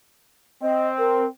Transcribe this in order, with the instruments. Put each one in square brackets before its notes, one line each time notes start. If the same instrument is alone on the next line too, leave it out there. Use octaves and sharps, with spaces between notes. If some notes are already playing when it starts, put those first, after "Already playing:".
[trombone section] C4 [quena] D#5
[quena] A#4